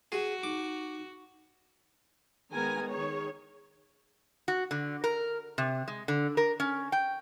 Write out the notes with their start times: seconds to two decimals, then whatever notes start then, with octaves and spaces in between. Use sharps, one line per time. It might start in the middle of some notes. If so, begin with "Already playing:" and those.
0.12 F#4 G#4
0.43 D#4 D6
2.53 D#3 G#3 B3 A#4 G#5 A#5
2.91 D#3 G#4 C#5
4.48 F#4
4.71 D3
5.04 A#4
5.58 C3
5.88 G#3
6.08 D3
6.37 A#4
6.60 C#4
6.92 G5